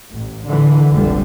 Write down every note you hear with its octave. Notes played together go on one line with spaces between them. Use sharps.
A1
D3 E3
F1 B1 D3 G3